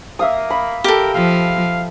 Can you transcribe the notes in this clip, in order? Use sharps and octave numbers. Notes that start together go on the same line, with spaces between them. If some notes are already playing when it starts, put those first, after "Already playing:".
A#3 E5 F5 D#6
B5
G4 A4 A#4
F3 F5